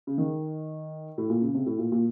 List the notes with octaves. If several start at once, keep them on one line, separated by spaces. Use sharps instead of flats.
C#3
D#3
A2
A#2
C#3
C3
A2
A#2
A#2